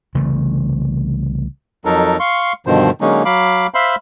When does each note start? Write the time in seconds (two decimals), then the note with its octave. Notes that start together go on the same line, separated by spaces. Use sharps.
0.15 C2 C#3 E3 A3
1.85 F2 F#3 D#4 A4 A#4
2.20 F5 C6 C#6
2.67 G2 B2 D3 D#3 F3 C5
3.01 D3 F#3 G#3 A#3 C#4 D#4
3.25 F#3 F5 B5 D6
3.74 C5 E5 F5 B5 C6